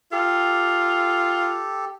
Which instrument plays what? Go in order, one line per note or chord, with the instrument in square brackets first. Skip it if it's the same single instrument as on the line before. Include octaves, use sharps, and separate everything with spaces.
[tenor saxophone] F4 [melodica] G4 A4